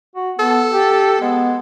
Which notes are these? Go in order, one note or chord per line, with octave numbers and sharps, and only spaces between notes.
F#4
B3 A4
G4
G#3 B3